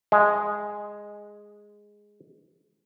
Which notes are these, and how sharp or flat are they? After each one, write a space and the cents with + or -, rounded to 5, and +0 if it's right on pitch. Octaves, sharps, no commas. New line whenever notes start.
G#3 -5